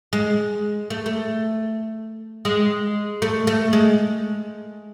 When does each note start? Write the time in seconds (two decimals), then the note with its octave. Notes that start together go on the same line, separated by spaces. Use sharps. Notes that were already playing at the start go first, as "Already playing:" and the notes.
0.13 G#3
0.90 A3
1.06 A3
2.45 G#3
3.22 A3
3.47 A3
3.73 G#3